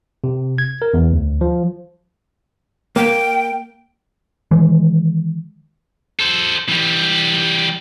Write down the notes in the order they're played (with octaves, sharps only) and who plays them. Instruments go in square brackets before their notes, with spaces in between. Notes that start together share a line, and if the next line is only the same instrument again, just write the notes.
[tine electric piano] C3
G#6
A#4
E2
D2
F3
[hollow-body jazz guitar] A#3 [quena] G5
[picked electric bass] D#3 E3 G#3
[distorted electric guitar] A4 C5
E3 G3